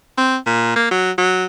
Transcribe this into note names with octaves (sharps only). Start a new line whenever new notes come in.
C4
A#2
A#3
F#3
F#3